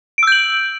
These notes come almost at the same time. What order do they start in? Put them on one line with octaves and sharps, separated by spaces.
D7 E6 G6 F#7